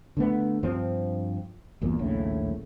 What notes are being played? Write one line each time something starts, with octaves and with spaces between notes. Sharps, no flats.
D3 A3 B3
G2 F3 C4
G1 E2 A#2
D#1 A#1 A2 C#3